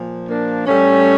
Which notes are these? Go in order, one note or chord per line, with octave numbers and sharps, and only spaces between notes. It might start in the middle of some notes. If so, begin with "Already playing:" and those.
Already playing: A#2 F3
A#3 D4
A2 G3 A3 C#4